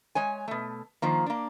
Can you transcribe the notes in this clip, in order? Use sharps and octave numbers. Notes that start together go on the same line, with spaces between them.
G#3 C#5 G#5
B2 A3
D#3 F3 A#3
A#3 D4